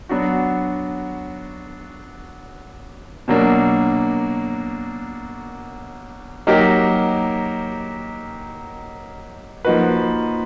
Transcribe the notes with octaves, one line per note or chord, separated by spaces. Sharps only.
F#3 B3 D4 F#4
B2 F#3 A#3 D4
F#3 A#3 D#4 G4 A#4
F3 A#3 D#4 F#4 B4